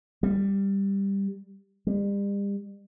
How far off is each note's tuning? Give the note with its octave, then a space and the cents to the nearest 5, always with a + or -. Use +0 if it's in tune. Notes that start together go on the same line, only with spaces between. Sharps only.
G3 +10
G3 +40